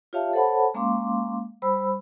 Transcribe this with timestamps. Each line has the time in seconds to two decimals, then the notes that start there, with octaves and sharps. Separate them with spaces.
0.13 F4 G4 C#5 E5 F5 A5
0.33 A4 C5 C#5 F#5 A5 B5
0.74 G#3 A#3 C#4 F5 C6 D6
1.62 G3 C5 B5 E6